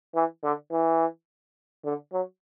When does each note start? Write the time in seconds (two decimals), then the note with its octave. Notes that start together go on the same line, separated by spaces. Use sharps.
0.15 E3
0.43 D3
0.71 E3
1.85 D3
2.12 F#3